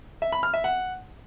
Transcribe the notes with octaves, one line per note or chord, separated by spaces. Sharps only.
E5
B5
F6
E5
F#5